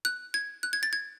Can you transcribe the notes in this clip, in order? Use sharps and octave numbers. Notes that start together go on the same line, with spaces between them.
F#6
G#6
F#6
G#6
A6
G#6